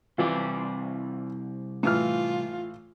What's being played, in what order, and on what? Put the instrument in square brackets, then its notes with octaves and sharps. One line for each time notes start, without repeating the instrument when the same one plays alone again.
[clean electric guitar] C2 C4 D5 [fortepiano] E3 F4
[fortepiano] A2 E3 F6 [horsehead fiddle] F4